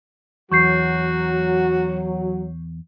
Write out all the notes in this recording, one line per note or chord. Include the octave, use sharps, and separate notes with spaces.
E2 F#3 F#4 C#6 G6 C7